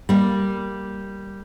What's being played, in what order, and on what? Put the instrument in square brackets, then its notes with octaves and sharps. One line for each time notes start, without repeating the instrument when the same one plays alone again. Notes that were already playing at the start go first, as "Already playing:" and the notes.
[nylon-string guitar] G3 A#3